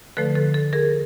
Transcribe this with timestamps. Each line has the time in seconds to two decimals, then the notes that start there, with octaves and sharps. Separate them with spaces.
0.17 D3 F3 A3 A4 B4
0.35 A4
0.54 A4
0.73 G#4 A#4